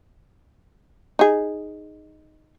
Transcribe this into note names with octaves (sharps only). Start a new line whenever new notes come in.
D#4 G#4